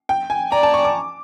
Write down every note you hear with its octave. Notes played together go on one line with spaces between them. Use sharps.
G5
G#5
D5 A#5
A5
C#6
D6